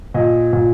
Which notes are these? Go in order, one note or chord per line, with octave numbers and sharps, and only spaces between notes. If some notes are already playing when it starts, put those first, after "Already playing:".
A#2 D#5
A#2